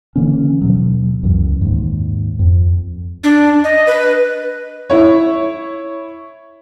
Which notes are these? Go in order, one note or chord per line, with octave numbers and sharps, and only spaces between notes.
D3 E3 A#3 C#4
D#2 B2 F#3
C#2 F#2 E3
D#2 G#2
F2
D4
D#5
B4
E4 C#5